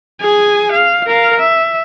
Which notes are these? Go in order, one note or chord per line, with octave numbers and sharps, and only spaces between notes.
G#4 G#5
F5
A#4 F5
E5